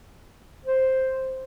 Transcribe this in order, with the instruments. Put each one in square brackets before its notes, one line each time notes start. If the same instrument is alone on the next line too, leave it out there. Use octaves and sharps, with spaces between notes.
[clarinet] C5